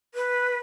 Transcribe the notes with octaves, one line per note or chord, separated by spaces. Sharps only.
B4